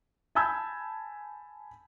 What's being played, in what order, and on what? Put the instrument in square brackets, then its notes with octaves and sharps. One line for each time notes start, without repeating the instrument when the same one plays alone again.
[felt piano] G#5 A5 B5 E6 G6 G#6